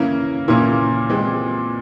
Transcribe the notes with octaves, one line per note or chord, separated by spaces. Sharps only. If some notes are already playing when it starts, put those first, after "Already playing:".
Already playing: C#3 E3 A#3 C#4 E4
A#2 C#3 E3 A#3 C#4 E4
E3 G#3 C4 G4